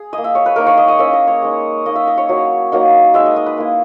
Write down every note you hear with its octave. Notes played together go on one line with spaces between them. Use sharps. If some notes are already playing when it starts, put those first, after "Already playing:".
Already playing: G#4
A#3 E4 D#5
E5
C#5
B4
A#3 D#4 A#4
C#5
D#5
D#5
A#3 C#4 E4 E5
D#5
C#5
G#3 D#4
A#3 D#4 D#5
E5
D#5
C#5
F#3 A#3 E4
F#3 A#3 D#4
G#3 D#4 E5
D#5
D#5
B4
A#3 E4